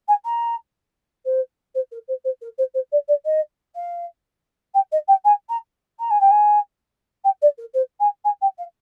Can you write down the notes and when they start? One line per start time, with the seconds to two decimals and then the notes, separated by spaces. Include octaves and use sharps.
0.08 G#5
0.25 A#5
1.25 C5
1.75 C5
1.91 A#4
2.08 C5
2.24 C5
2.41 A#4
2.58 C5
2.74 C5
2.92 D5
3.08 D5
3.25 D#5
3.75 F5
4.74 G5
4.92 D#5
5.08 G5
5.25 G#5
5.49 A#5
5.99 A#5
6.10 G#5
6.20 G5
6.31 G#5
7.24 G5
7.42 D5
7.58 A#4
7.74 C5
8.00 G#5
8.24 G#5
8.41 G5
8.58 F5